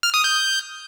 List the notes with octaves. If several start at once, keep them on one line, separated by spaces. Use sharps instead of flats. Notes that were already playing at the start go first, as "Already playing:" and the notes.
F6
D#6
G6